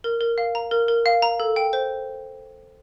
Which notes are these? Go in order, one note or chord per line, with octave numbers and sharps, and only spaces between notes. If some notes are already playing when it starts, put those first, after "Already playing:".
A#4
A#4
F5
A#5
A#4
A#4
F5
A#5
A4
G5
C5